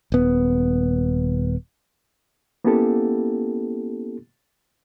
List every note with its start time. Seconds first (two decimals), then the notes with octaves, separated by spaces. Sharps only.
0.12 D#1 B3
2.64 A#3 B3 C#4 E4 G4 A4